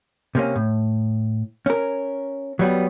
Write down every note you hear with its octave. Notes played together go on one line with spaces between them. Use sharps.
C3 A#3 C#4
A2
C#4 A#4
F#3 G3 B3